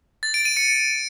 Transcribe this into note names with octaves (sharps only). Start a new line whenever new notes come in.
A6
D7
D#7
C#7